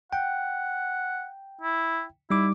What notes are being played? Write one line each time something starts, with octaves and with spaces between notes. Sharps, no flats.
F#5 G5
E4
G3 D#4 E4 D6